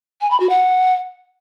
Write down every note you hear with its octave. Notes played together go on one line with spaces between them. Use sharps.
G#5
B5
F#4
F#5